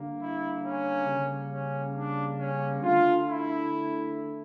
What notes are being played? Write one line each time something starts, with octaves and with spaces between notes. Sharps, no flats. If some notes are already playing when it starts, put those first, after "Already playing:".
Already playing: D3 G3 A#3
E4
C#4
C#3 G3 A#3
C#4
D4
C#4
D3 A3 F4
E4